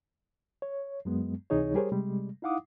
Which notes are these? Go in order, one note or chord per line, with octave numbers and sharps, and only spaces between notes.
C#5
F#2 F#3 G#3 B3
C#2 C3 E3 D#4 G#4 C#5
G3 G4 G#4 A#4 C5 C#5
C3 G3 G#3
D#4 E4 F5 F#5 D6 D#6